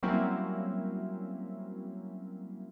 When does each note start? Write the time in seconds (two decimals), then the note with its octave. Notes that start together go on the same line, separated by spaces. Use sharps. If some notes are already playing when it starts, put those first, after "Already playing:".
0.03 F#3 G3 A#3 C4 C#4 E4